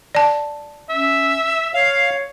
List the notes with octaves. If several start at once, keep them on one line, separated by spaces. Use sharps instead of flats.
D5 A5
C#4 E5
C#5 F5